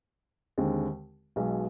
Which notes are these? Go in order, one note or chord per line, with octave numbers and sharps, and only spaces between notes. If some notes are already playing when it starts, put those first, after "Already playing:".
D#2 D3 G#3 C4
B1 B2 G#3